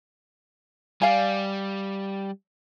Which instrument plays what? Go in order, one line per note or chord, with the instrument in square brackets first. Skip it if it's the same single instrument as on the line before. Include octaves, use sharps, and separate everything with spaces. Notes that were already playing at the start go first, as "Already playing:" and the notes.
[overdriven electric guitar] G3 [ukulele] D5 F5 G#5